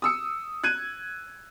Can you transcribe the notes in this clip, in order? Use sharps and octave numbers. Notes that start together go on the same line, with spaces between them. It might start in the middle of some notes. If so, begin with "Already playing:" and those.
D#6 E6 C#7
F#6 G#6 D#7